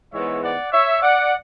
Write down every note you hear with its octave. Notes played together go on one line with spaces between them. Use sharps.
G#2 E3 G#3 B3 C#5 E5
D5 F#5
C#5 E5
D5 F#5